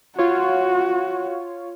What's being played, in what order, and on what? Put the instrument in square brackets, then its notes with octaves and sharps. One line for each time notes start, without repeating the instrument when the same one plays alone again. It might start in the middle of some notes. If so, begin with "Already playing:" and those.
[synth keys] F4 C#5 [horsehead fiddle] F#4